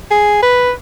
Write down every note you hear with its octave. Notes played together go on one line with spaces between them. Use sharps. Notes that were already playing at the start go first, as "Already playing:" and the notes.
G#4
B4